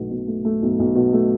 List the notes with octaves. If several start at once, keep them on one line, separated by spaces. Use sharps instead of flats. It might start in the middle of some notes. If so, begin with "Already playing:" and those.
Already playing: B1 B2 A3
B2
A3
A3
B1
B1
B2
A3